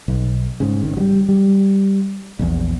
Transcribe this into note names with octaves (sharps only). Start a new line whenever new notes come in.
B1
G#2 C#3
G#1 D#3
F#3 G3
G3
A#1 E2